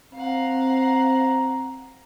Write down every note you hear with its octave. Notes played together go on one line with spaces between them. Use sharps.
C4 F5 F#5 A#5